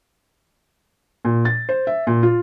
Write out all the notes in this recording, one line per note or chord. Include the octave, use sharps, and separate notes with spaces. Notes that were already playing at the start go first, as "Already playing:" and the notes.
A#2
A6
C5
E5
A#2
F4